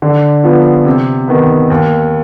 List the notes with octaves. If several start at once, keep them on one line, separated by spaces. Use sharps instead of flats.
D3
F3 B3 F4
C3
D#3 B3
D#2